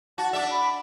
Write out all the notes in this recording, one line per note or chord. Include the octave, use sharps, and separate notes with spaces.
F#4 A5
D4 D5 E5
B5